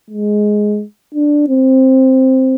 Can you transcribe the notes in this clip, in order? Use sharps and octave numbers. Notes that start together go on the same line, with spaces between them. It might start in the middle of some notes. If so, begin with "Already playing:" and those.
G#3
D4
C4